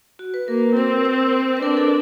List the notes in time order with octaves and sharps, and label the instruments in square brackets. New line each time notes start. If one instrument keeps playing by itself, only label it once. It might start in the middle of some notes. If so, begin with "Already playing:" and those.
[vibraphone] F#4
B4
[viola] A#3 [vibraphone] A#4
[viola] C4 [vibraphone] A#4
[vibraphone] C5
B4
[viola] D4 [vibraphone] A#4
[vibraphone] A4